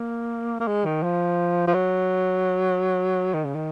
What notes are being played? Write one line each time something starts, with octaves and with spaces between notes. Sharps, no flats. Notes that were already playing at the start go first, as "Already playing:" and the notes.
Already playing: A#3
A#3
G#3
D#3
F3
F3
F#3
D#3
C#3
D#3